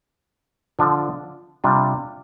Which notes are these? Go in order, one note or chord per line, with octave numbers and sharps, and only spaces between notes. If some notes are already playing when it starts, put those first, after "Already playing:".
D3 F3 D4 F4
C3 G3 D4 F4